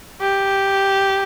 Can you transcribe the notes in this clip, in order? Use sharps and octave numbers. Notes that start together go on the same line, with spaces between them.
G4